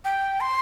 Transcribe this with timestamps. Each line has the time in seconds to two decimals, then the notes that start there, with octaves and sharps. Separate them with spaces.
0.05 G5
0.41 C6